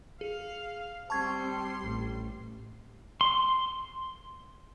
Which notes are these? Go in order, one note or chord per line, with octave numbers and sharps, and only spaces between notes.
G#4 F5
G3 C4 A5 C6 C#6 G#6
A1
C6